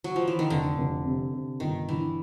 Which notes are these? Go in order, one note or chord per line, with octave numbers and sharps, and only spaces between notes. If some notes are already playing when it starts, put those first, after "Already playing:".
F#3
F3
E3
D#3
F1 D3
F1
C3
C3
G1 D#3
D3 E3